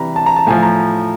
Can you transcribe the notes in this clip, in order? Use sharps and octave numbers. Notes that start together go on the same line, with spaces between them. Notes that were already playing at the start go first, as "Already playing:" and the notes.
Already playing: C3 E3 G3 A#5 B5
A5
A#5
A5
A2 F3 G#5
A#5